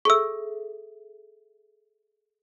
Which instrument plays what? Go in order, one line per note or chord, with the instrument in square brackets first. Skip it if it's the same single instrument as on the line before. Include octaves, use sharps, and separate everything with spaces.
[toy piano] G#4 A4 E5 [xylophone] C#6 E6